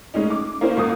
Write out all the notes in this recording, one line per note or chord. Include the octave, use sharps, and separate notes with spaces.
A2 G#3 C#4 D#4
D6
A#3 C#4 E4 C5
G#1 A#3 D#6